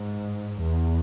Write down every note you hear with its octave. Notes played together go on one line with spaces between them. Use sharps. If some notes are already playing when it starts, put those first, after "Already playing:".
Already playing: G#2
E2